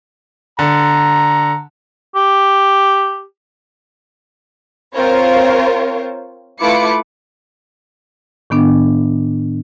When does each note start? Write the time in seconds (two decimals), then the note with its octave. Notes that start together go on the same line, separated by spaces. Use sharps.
0.59 D3 A#5
2.16 G4
4.95 C4 F4 A#4 C5 C#5
6.59 A3 E4 F4 B4 D6 C#7
8.50 A2 D#3 B3 D4